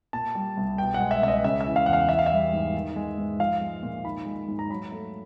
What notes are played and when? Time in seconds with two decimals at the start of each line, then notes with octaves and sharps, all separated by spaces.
0.13 A#2 A5
0.35 G3
0.57 C2
0.78 B2 G5
0.94 F#5
1.00 G#3
1.11 E5
1.22 C#2 E5
1.28 D#5
1.44 C#3 E5
1.61 E5
1.66 E3
1.76 F5
1.86 E2 F#5
1.93 F5
2.09 E3 E5
2.19 F5
2.26 E5
2.31 G3
2.53 G#2
2.74 D#3
2.96 G#3
3.18 G#2
3.39 F3 F5
3.61 G#3
3.83 A#2
4.04 D#3 B5
4.26 G#3
4.48 G#2
4.59 A#5
4.70 F#3 B5
4.92 A3